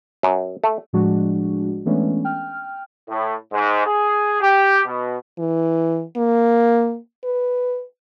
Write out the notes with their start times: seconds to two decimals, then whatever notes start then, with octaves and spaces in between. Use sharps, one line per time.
0.23 F#2
0.64 A3
0.93 A2 F3 G#3 D4 F#4
1.85 E3 G#3 A3 B3 C#4 D4
2.24 G5 F6
3.08 A2
3.51 G#2
3.86 G#4
4.42 G4
4.85 B2
5.39 E3
6.17 A#3
7.24 B4